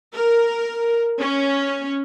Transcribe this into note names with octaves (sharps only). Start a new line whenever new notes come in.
A#4
C#4